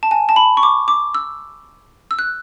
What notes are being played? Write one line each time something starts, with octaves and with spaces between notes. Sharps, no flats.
A5
G#5
A5
B5
C#6
D6
D6
E6
E6
F#6